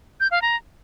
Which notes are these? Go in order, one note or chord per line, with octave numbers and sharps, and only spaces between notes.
G6
F5
A#5